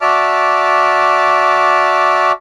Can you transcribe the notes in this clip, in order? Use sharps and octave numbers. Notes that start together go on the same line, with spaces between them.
F#4 D5 E5 A5 D6 F6